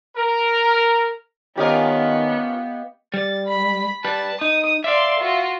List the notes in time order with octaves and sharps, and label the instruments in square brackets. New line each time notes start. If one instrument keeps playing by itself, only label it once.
[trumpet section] A#4
[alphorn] D#3 [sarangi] B3 [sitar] C#4 F4 A#4 [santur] G4 D#5 F5
[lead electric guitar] G3 [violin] A6
[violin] B5
[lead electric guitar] G3 B4 [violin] A5
[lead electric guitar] D#4 [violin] D#6
[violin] D5 C6 [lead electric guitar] E5 F5
[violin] F4 F#4